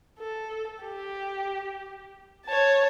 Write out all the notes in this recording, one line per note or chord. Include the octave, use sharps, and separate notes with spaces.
A4
G4
C#5 A5